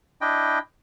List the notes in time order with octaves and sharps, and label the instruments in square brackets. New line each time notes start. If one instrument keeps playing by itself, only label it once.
[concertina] D4 E4 D#5 G5